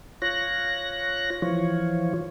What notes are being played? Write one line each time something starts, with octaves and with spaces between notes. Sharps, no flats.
F4 C#5 F#6 A#6
E3 F3 F4 C#5